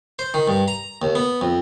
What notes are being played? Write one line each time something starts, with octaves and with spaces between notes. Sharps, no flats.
C5
D#3
G2
A#5
D#2
B3
F2